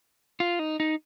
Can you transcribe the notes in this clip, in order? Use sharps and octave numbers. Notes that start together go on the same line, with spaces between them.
F4
D#4
D#4